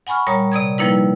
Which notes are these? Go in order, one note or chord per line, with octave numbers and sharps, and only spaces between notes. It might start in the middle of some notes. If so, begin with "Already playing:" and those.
F#5 G#5 B5 C#6 F6
A#2 G3 C#5 A#5 D#6
C3 D5 D#6 G#6
F3 G3 A#3 D#4 E4 B4